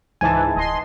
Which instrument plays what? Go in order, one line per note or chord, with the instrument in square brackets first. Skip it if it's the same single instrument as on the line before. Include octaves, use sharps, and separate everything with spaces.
[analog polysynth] C#2 G#2 E3 [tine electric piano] G#5 A5
[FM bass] D1 [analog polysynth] D#5 C6